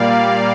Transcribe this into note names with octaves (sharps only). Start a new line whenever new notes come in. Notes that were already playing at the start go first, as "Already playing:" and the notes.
Already playing: A#2 G3 A#3 D5 F5